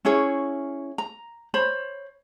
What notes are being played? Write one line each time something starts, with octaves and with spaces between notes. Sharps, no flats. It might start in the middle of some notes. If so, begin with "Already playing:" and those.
C#4 E4 G#4 C#5
A#5
C5 C#5 B5